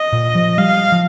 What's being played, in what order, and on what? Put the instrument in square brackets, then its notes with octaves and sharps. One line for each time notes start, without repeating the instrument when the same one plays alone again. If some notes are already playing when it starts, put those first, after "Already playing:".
Already playing: [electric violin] D#5
[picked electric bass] A#2
F3
[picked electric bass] G3 [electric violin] F5
[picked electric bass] F3